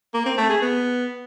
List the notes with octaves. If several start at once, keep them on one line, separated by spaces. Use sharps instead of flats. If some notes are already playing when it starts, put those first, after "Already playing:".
A#3
C4
A3
G#4
B3